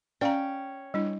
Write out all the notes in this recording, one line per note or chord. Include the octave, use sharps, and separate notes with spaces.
C#4 D5 F5 G5 A#5
G3 D4 E4